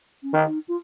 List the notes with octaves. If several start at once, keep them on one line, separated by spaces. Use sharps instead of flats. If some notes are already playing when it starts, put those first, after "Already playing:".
C#4
D#3 D#4
F4